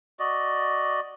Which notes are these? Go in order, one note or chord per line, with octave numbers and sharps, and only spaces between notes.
F#4 D5 D#5